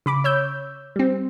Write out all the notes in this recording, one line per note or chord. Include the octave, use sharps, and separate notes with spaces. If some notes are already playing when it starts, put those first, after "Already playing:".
C#3 B5 D6
C#5 E6 G6
G3 C4